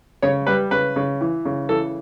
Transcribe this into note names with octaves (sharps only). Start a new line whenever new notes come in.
C#3 C#5
G3 B4
C#3 B4
C#3
E3
C#3
E3 A4